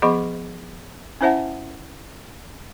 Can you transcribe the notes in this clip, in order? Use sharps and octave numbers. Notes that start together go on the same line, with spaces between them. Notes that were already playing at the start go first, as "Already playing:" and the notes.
F3 B3 G#4 D#5 B5 C#6
C#4 E4 C5 E5 F#5 A5